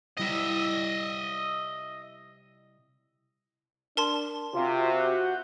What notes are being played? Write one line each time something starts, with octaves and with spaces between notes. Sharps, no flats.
C3 G3 E4 D#5 E5
D4 A#4 A5 C6
C3 F4 F#4
F#5 G6